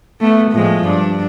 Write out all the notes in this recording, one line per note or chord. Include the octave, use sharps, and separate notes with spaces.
A3 B3
A2 F3 G#3
G2 D4